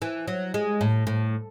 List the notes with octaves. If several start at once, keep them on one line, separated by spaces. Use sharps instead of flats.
E3
F#3
G#3
A2
A2